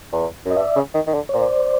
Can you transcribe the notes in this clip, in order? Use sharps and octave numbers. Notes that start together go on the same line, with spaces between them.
E2
F#2 D#5
G2 D5 E5
C#3
D#3
D#3
D3
C#5
A#2 C5 D5